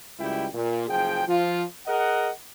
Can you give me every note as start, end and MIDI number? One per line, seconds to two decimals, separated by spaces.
0.18 0.46 37
0.18 0.46 42
0.18 0.46 55
0.18 0.46 64
0.18 0.46 79
0.54 0.85 46
0.88 1.22 30
0.88 1.22 53
0.88 1.22 68
0.88 1.22 79
1.27 1.64 53
1.27 1.64 65
1.87 2.29 68
1.87 2.29 70
1.87 2.29 75
1.87 2.29 78